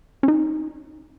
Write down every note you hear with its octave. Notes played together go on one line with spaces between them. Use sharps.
C#4
D#4